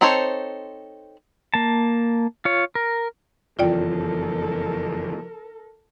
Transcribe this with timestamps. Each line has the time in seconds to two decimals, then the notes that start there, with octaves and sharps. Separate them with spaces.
0.01 C4 D#4 A4 C5 C#5
1.54 A#3 A5
2.45 F4 C#5
2.75 A#4
3.59 F#1 F2 E3 F4 A4 A#4 D5 G5